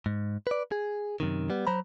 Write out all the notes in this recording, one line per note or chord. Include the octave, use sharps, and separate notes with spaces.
G#2
B4 D5
G#4
F#2 C3 D#3
G3 B3
F#3 C5 A#5 B5